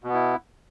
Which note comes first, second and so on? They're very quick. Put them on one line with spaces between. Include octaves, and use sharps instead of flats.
B2 B3 E4